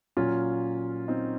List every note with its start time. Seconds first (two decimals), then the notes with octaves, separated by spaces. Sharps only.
0.17 A#2 F#3 C#4 F4
1.08 C4 D#4